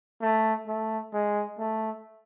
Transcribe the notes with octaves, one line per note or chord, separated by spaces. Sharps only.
A3
A3
G#3
A3